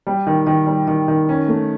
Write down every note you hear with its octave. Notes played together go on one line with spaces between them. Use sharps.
G3
D#3
D#3
G3
D#3
D#3
C#4
A3